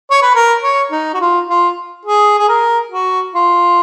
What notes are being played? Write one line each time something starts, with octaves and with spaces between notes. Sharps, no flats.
C#5
B4
A#4
C#5
D#4
F#4
F4
F4
G#4
G#4
A#4
F#4
F4